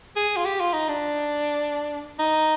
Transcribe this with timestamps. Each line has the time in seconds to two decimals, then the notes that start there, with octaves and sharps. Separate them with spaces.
0.16 G#4
0.37 F4
0.45 G4
0.60 F4
0.73 D#4
0.89 D4
2.19 D#4